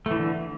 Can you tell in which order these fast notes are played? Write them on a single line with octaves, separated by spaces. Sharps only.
A3 E3 D3